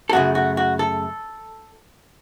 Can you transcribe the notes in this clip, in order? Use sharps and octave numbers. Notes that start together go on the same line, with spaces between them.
A4
F#2 C#3 A3 F#4
F#4
F#4
A4